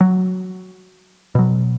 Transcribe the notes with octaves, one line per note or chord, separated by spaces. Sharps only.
F#3
B2 F#3